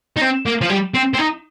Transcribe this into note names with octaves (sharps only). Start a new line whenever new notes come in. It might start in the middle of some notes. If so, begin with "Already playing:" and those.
D#4
C4
A#3
F3
G3
C4
C4
D#4